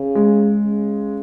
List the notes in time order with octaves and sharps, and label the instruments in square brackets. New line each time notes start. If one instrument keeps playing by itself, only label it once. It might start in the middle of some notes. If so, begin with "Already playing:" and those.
Already playing: [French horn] C#3
[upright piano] G#3
[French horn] C#3